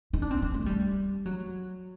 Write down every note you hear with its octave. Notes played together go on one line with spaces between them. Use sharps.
D#4
D4
C4
C4
A3
G3
F#3